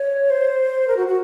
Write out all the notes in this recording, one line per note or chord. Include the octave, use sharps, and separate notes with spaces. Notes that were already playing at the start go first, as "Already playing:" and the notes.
Already playing: C#5
C5
A#4
F#4
F#4